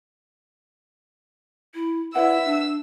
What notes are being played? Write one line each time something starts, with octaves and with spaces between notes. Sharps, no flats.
E4
E4 B4 D5 E5 F#5 E6
D4